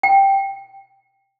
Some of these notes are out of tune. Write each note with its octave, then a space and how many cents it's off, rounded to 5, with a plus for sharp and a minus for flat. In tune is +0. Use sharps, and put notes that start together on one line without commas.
G5 +0